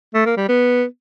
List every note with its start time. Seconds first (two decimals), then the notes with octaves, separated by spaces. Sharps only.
0.15 A3
0.26 A#3
0.37 G3
0.49 B3